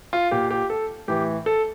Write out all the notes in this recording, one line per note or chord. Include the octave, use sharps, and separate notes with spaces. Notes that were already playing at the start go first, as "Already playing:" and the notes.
F4
A#2 G4
G4
A4
A2 E3 G4
A4